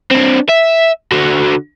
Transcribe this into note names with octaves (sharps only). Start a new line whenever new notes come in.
C4 D4
E5
D3 F#4